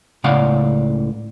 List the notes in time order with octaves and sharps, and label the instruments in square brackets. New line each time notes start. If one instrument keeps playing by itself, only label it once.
[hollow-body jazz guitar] C#2 A2 C#3 D5 F5 F#5